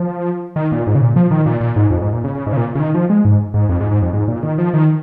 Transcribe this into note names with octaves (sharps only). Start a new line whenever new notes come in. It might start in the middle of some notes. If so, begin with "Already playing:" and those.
Already playing: F3
D#3
A#2
G#2
C#3
A#2
F3
D#3
A#2
A#2
G#2
F2
G#2
A#2
C#3
C#3
G#2
C#3
A#2
C#3
D#3
F3
G#3
G#2
G#2
F2
G#2
G#2
F2
G#2
A#2
D#3
F3
D#3